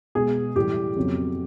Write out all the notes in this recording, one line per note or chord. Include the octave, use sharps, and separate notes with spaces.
B2 G#3 B3 G#4
A2 E3 G3 G4
F2 C#3 F#3 B3